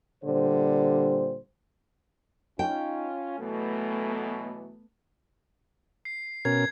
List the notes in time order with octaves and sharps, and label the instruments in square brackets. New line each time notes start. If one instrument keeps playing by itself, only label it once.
[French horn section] A#2 D3 G3 C5
[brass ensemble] C#4 F4 [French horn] D#4 [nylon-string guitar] G5
[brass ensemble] B2 E3 F#3 [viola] A3 B3 [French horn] A4
[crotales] C7
[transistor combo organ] B2 C#4 A#4 [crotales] G#6